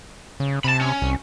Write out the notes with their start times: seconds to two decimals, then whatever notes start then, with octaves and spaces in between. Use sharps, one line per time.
0.40 C#3
0.64 C3 A5 B5
0.81 C#4
1.02 C2